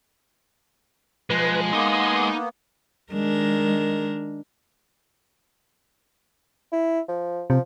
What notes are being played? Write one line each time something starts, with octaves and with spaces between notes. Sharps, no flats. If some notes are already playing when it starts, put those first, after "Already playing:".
B1 F3 G#3 B4
A#3 B3 D#4 C6 D#6
D#3 G#3 D4 A#4
E4
F3
C3 F3